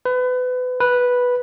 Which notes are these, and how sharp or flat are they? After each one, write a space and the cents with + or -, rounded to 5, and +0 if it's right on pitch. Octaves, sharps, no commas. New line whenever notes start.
B4 +30
B4 -5